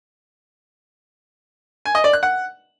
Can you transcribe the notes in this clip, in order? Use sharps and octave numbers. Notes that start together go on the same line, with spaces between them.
G#5
D#5
D5
F#6
F#5